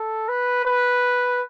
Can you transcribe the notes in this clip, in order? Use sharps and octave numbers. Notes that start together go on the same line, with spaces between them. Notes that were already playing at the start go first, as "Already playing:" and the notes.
Already playing: A4
B4
B4